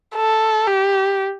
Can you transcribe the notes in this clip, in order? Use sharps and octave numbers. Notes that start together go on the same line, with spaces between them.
A4
G4